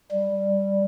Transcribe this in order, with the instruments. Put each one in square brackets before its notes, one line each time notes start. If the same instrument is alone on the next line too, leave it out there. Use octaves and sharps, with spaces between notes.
[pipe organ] G3